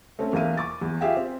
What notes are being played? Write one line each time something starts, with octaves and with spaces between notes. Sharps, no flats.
A3 C4 C#4
E2 A#3 E5 F5 D#7
C#6 D6 A6
E2
F4 G4 G#4 E5 F5 G5
C4